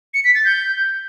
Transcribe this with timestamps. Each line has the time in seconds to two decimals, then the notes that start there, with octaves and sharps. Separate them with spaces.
0.14 C#7
0.24 B6
0.35 A6
0.45 G6